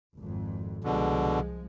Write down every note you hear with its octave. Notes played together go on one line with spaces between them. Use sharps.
G#1 F2
C2 B2 D3 F3 G#3